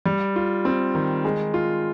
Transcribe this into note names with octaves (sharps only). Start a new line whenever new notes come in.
G3
F4
C4
D#3
G#3
F4